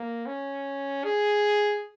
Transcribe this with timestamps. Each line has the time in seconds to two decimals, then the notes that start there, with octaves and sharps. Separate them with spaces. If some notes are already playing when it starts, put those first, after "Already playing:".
Already playing: A#3
0.26 C#4
1.04 G#4